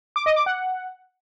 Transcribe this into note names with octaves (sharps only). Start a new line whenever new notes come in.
D6
D#5
D6
F#5